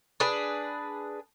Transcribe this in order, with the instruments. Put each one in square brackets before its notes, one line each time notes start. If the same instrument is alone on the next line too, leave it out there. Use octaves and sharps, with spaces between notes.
[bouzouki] D4 G#4 B4